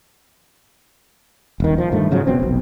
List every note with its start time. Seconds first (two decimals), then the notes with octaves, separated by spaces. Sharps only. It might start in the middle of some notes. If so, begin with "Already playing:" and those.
1.60 D#1 D#3
1.78 F3
1.92 G2 D#3 A3
2.11 G#2 C#3 F3 F#3
2.27 F1 B2 C4
2.40 F1 B1